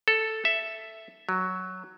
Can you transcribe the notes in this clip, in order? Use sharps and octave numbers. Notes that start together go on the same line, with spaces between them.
A4
E5
F#3